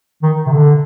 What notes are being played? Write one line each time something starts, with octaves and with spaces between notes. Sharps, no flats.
D#3
C3
D3